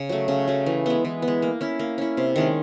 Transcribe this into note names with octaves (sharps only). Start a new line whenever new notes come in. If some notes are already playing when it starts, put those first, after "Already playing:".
Already playing: C#3
F#3 A3
C#3
F#3 A3
E3
G#3 B3
E3
B3
G#3
A#3
C#4 E4
A#3
C#4 E4
C3
D#3 G#3 C#4